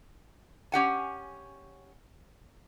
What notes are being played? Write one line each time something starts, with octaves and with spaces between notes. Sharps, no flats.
C#4 G4 F#5 G#5